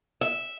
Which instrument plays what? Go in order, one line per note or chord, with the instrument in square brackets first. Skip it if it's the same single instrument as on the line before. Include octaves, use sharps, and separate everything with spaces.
[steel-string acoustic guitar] E5